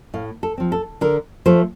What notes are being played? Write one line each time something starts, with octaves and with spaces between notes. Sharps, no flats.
A2 F5
A4
F3 C4
A4
D3 A#4
F3 A3 C5